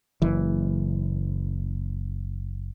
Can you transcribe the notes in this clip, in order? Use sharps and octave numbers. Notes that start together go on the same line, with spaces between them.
F#1 E3